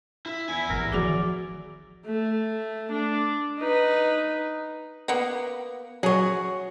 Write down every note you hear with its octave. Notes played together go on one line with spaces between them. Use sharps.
E4
E2 E4 G#5
A1 A#4
D#3 F3 B3 F#4 G#4 D5
A3
D4
D#4 B4
A#3 B3
F#3 G#4 C#5